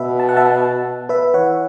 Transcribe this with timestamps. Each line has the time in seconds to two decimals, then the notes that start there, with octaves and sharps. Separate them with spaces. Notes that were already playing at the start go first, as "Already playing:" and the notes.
Already playing: B2 B4 E5
0.20 A5
0.29 F#5
0.36 E5 A5
1.09 B4 E5
1.34 E3 C#5 F#5